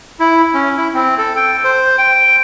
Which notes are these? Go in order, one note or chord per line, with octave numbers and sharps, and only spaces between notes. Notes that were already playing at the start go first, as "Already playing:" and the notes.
E4
C#4
E4
C4
A4
G5
C5
G5